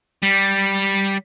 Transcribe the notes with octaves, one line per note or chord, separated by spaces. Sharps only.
G3